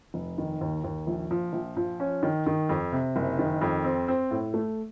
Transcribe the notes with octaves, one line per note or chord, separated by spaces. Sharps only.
F1
D#3
D#2
D#2
A#1
F3
A#1
F3
C#4
D#3
D#3
F2
C3
F#1
D#3
F2
C4
C4
A2
A3